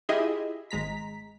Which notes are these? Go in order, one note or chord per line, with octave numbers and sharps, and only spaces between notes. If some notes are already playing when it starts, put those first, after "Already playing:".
E4 F4 G4 G#4 D#5 E5
G#1 G#3 A#5 B6